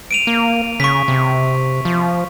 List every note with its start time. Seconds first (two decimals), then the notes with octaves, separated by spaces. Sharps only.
0.11 D7 D#7 F7
0.27 A#3
0.80 C#3 C#6 B6
1.08 C3
1.85 F3